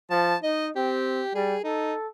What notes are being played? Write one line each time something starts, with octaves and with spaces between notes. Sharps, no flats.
F3 A5
D#4 D#5
C4 G4
G3 G#4
D#4 A4